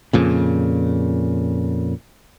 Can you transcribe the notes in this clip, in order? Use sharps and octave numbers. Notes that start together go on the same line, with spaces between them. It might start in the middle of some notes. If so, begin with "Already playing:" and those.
F2 A#2 C#3